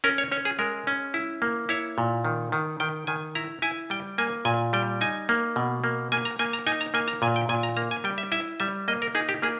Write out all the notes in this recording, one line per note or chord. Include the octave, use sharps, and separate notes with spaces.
C#4 A#4
C#5
C#4 C#5
G#4
G#3 A#4
C#4
E4
A#3
E4 C#5
A#2
D#3
D#3
D#3 G5
D#3 G#5
E4 A#5
E4 G#5
G3 G5
A#3 G#5
A#2 G#5
G3 G5
D#4 G#5
A#3
B2
A#3
A#3 G#5
A#5
A#3 G#5
A#5
D#4 G#5
A#5
A#3 G#5
A#5
A#2 G#5
G5
A#2 G#5
A#5
A#3 A#5
G#5
G3 G5
E5
E4 E5
G3 E5
A#3 D#5
A#4
D#4 G#4
G4
A#3 G#4